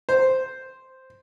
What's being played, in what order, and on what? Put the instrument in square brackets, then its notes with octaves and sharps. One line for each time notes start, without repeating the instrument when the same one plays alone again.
[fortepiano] C5